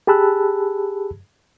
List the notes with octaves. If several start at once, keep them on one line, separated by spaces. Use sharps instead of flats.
G4 G#4 A5 B5 E6 F#6